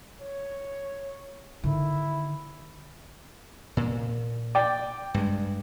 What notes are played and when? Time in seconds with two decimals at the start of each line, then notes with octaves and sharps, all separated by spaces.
0.21 C#5
1.64 D3 D#3 E4
3.77 A#2
4.55 D5 G5
5.14 G2 G#3